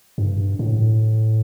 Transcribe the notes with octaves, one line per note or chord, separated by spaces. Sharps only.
G2
A2